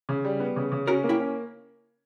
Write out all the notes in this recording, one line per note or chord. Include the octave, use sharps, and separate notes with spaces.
C#3
G3
B3
C#3
C#3
C#4 F#4 A#4
A#3
E4 G4
C#4